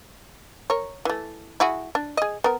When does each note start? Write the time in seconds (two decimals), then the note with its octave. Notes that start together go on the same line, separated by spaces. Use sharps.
0.70 A#4 C#5
1.05 E3 A3
1.60 E4 F#4 G#4
1.95 D4
2.17 G#4 D#5
2.44 B3 A#4